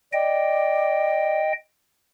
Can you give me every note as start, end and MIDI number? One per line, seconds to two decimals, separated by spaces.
0.13 1.41 74
0.13 1.52 75
0.13 1.52 79